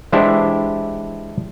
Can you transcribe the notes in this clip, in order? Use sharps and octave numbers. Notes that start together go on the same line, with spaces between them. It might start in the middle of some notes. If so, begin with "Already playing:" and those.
E3 G#3 D4 E4 G4 C5